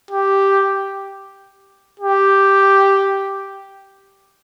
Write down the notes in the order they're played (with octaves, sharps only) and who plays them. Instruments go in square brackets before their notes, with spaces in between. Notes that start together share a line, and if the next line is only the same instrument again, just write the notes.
[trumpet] G4
G4